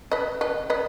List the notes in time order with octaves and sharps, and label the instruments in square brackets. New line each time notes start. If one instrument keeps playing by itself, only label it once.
[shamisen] B4 D#5
B4 D#5
B4 D#5